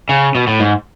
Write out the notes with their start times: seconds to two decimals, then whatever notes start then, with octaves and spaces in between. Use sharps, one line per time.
0.09 C#3
0.35 B2
0.47 A2
0.60 G#2